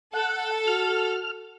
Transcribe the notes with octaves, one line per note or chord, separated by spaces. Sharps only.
A4 F#5
F#4 F6